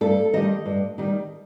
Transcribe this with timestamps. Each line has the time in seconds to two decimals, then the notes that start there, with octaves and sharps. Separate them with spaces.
0.01 G2 A4
0.33 D#3 G3 D#5
0.66 G2
0.98 D#3 G3